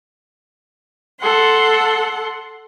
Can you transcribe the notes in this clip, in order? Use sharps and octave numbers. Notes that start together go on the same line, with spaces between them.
A4 F#5 C6